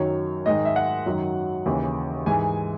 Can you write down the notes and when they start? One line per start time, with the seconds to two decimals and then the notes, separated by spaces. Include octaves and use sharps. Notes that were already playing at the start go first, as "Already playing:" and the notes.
Already playing: F#2 D#3 F#3 C#5
0.46 G#2 D#3 G#3 D#5
0.65 E5
0.76 F#5
1.06 F#2 D#3 F#3
1.66 D#2 C#3 E3
2.26 G#2 E3 G#3 G#5